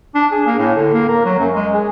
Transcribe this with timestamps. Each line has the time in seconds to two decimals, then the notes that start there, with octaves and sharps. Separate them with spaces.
0.15 D4
0.32 G#4
0.46 A#3
0.58 A2
0.76 D3
0.94 A#3
1.08 A#4
1.25 F#3
1.39 F#2
1.54 G#3
1.74 G#4